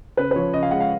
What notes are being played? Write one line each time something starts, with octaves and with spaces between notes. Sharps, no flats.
C#3 B4
B4
F3 C#5
C#3 D#5
F5
G#3 F#5
F5